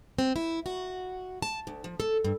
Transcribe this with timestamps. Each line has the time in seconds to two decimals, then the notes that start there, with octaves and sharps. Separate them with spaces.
0.19 C4
0.36 E4
0.66 F#4
1.42 A5
1.67 D2
1.84 F3
2.00 A4
2.24 G2